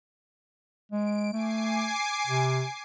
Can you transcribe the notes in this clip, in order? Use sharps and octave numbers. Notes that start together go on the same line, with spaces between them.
G#3 D7
A3 G#5 D6 C7
C3